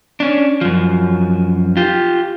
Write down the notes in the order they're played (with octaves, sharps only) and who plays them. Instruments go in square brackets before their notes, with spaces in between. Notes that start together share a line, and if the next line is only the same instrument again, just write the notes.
[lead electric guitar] C#4 D4
F#2 F3
F4 G4